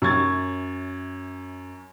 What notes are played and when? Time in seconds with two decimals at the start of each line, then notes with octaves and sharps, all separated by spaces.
0.02 F#2 C#6 G#6 A6